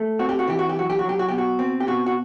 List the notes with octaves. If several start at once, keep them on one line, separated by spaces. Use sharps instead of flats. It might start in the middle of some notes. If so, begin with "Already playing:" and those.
Already playing: A3
C4 F#4
G4
F#4
E3 G4
F#4
G4
F#2 F#4
G4
F#4
F#3
G4
F#4
B2 G4
F#4
C4
G4
B2 F#4
F#4